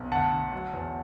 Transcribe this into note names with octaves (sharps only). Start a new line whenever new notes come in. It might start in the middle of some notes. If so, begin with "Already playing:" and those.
Already playing: B1
D2 F#5 A5
D2
F#3
E2